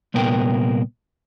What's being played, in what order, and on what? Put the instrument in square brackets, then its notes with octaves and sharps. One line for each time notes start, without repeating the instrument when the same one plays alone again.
[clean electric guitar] C2 A#2 B3 A#4 G5